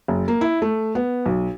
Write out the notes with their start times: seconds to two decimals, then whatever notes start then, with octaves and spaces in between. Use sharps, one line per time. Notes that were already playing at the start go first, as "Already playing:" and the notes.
0.08 F#1
0.28 A#3
0.41 E4
0.62 A3
0.95 B3
1.26 B1